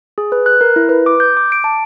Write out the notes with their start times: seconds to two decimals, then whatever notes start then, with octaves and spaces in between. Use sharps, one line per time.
0.18 G#4
0.32 B4
0.46 F#6
0.61 A#4
0.76 E4
0.89 B4
1.06 D6
1.20 G6
1.37 D6
1.52 D7
1.64 A5